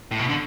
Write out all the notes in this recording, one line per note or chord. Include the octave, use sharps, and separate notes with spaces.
A2
B2
D3